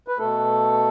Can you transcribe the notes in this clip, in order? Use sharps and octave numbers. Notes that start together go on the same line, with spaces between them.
B4
B2 A3 A4